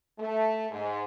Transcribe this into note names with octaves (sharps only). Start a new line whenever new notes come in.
A3
G#2